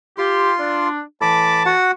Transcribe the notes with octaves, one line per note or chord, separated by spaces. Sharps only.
F4 G4 C6
D4
A2 E3 A5 B5 D6
F#4 F#5